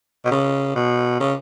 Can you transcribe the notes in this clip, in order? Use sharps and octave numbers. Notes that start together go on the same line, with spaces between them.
B2
C#3
B2
C#3